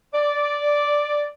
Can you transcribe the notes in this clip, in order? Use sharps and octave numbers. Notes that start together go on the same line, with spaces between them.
D5